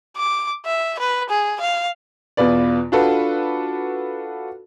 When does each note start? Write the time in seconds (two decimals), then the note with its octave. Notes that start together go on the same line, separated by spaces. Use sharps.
0.17 D6
0.66 E5
1.00 B4
1.30 G#4
1.61 F5
2.37 E2 B2 F4 B4 D5
2.92 D4 F4 F#4 A4 B4